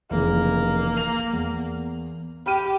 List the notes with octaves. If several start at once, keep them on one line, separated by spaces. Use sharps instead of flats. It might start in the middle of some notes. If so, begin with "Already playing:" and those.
F1 C#3 E3 A#3
F7
E2
G4 B5 F6 D#7